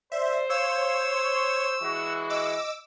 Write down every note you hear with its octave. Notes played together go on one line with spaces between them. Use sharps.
C5 D5 E5
C#5 F5 E6
C#6
E3 G#3 F#4
D#5 D6 E6